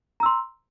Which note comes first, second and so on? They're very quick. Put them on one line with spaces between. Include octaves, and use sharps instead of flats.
A#5 E6 C6